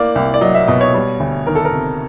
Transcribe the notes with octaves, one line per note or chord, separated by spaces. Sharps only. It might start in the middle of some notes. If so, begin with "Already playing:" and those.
Already playing: A2 A#3 D5
C2
D5
F#3 D#5
E5
B2 D#5
C#5
G3
D2
D#3 A#4
A4
A#4
C3